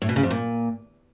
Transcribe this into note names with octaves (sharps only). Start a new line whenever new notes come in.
A2
B2
C#3
F2
A#2